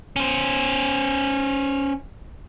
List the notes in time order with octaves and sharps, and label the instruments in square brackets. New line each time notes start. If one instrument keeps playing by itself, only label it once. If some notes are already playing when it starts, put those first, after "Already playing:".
[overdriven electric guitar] C#4 C5